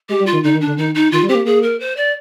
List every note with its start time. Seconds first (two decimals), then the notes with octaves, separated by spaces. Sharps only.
0.09 G#3 G4
0.20 G3
0.26 F4
0.33 D#3
0.43 D3 D#4
0.55 D#3
0.61 D4
0.67 D3
0.77 D#3 D#4
0.95 D#4
1.12 D#3 F4
1.23 G3
1.29 C4 G4
1.35 A#3
1.45 A#3 G#4
1.63 A#4
1.80 C5
1.97 D5